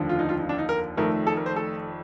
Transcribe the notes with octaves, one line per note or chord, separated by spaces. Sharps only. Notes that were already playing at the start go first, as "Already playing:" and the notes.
Already playing: F1 D#2 D3 F3
F4
D#4
F4
D#4
D4
D#4
A#4
F1 F2 D#3 A3 A#4
A4
A#4
C5
A4